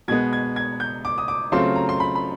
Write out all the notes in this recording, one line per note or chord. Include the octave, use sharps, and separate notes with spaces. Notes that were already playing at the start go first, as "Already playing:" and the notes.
B2 G#3 B3 G#6
G#6
G#6
G6
D6
D#6
D6
C#3 F#3 A3 C4 F4 C6
A#5
C6
B5
B5